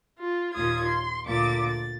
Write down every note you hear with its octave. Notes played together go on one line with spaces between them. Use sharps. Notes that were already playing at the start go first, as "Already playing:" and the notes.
F4
D#2 A#2 F4 D#6 G#6
C6
D2 A#2 D6 A6
A6